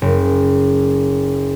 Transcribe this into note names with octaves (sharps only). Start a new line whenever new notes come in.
F#1